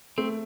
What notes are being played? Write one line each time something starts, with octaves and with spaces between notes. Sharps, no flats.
A3 C4